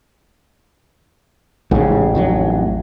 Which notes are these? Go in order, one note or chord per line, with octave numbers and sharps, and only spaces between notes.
A1 G#2 C#3
F2 D#3 F#3